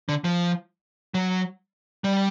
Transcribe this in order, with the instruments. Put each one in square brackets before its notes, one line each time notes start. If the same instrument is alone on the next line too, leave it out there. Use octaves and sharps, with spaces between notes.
[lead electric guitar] D3
F3
F#3
G3